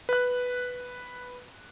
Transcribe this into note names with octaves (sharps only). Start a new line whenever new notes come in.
B4 F#6